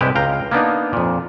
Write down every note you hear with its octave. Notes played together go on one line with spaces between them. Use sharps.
C2 G#3 E4 G4 B4
C#2 F5 G5 A#5
A#3 B3 D4 D#4
F2 A#2